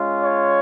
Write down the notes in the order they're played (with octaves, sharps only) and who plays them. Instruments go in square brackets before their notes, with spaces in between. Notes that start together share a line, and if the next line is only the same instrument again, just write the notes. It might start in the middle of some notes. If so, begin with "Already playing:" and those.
Already playing: [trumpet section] G#3 C#4 F4
C#5